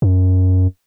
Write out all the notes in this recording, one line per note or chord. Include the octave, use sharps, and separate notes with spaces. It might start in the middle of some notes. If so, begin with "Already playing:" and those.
F#2